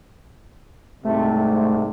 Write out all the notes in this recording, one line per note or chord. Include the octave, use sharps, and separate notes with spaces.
C2 G#2 C3 A3